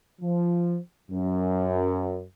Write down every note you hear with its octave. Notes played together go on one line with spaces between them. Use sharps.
F3
F#2